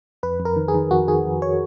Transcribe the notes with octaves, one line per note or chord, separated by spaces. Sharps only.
F2 B4
F2
A#4
D#3
G#4
D#3
F2 F#4
D#3 G#4
F2
C#5